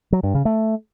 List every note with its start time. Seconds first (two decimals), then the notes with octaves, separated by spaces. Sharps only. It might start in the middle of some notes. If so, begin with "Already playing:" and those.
0.12 F#3
0.23 G2
0.34 C#3
0.45 A3